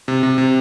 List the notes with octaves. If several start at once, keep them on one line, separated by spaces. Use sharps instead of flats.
C3
C3
C3